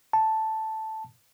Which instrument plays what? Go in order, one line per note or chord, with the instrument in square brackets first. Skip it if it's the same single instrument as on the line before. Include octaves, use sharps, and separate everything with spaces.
[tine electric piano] A5